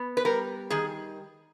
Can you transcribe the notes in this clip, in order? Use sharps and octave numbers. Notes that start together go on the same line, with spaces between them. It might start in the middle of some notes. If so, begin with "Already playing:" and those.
Already playing: B3
B4
G3 A#4
D#3 G#4